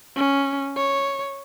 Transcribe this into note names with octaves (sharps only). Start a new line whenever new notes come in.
C#4
C#5